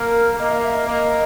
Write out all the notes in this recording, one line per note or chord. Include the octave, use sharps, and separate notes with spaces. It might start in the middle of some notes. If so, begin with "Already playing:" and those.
Already playing: A#3 A#4
A#3 D#5
F5
E5
D#5
A#3 D#5